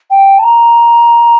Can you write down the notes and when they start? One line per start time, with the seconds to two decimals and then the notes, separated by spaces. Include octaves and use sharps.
0.10 G5
0.39 A5
0.43 A#5